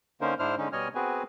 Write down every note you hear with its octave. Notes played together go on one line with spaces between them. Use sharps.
D3 A#3 C#4 D#4 A#4 C5
G#2 D4 E4 C5 F6
D3 G#3 C#4 D#4
B2 G3 C#5 D#5 G#5 F6
B3 C4 F#4 G#4 B4 G#5